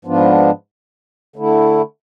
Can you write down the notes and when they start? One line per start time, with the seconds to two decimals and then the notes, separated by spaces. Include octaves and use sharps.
0.05 G#2 F3 B3 D4 F4
1.36 D3 A3 E4